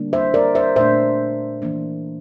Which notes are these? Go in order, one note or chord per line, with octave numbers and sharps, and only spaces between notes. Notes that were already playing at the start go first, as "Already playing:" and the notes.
Already playing: D3 G3 A#3 D4
C5 E5
A#4 D5
C5 E5
A#2 A3 D4 C5 E5
E3 A#3 D4